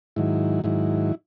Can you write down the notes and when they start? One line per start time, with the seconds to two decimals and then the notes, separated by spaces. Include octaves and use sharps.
0.16 G#2 D#3 F#3 E4
0.64 G#2 D#3 F#3 E4